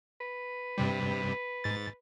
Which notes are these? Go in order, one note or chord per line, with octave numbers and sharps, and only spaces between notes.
B4
G2 C3 G3
G#2 A6